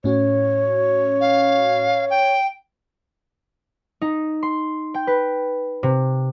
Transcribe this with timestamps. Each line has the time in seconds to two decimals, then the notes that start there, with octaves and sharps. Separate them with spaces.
0.04 A2 C#4 F#4 C#5
1.21 F5
2.10 G5
4.01 D#4
4.43 C6
4.94 G5
5.07 B4
5.83 C3